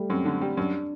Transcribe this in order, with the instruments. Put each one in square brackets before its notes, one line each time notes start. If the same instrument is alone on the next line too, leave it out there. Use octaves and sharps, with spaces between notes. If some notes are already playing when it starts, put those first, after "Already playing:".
Already playing: [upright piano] G3 A3
[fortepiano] F#2 [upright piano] C4
[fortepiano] D3
G3
[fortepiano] F#2 [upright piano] D4